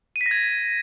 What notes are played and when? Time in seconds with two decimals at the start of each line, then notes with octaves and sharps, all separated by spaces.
0.16 D#7
0.21 B6
0.26 A#6
0.31 G#6